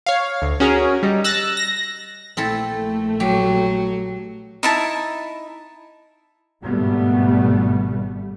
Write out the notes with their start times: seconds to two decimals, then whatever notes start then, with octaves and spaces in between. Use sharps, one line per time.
0.06 C#5 F5
0.42 D2
0.60 C#4 F#4 G#4 A#4
1.03 G3 D#4
1.24 E6 F#6 A6 A#6
1.57 A#6
2.37 A#1 A3 C4 E4 A4
3.20 F#3 G4
4.63 D#4 E4 A5
6.64 G#1 G2 B2 G3 A3 B3